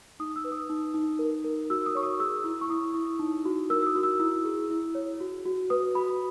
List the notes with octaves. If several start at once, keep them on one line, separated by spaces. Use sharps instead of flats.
D#4 D#6
E6
B4
D#6
D#4
D#4
A#4
A#4
F#4 E6
D#6
C#5 C#6
D#6
G#4 E6
E4
C#6
E4 D#6
E4
D#4
F#4
A#4 E6
E6
D#6
F#4
E6
E4 E6
G#4
E4
C#5
F#4
F#4
B4 D#6
F#4 B5